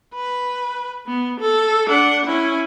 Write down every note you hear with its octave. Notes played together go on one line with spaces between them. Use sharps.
B4
B3
A4
D4 F#5
C#4 E4